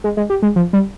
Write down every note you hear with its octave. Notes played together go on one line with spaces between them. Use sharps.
G#3
G#3
G4
G#3
F3
G3